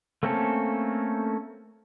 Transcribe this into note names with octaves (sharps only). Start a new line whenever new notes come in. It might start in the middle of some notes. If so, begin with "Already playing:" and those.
A3 A#3 C4 C#4 A4